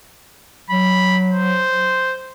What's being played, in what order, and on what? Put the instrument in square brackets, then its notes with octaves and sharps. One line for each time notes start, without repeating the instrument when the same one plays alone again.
[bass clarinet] F#3 [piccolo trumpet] B5
[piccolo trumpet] C5